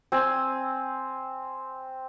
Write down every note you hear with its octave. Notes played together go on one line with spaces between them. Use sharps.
C4 C5 G#5